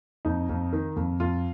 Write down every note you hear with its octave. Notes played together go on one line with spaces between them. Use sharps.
F2 D#4
F2
D#3
F2
F2 F4